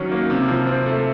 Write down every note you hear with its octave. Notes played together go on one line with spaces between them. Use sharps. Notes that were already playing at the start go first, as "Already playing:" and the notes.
Already playing: D#3 F#3 C#4
A#3
C3
F3
C4
A3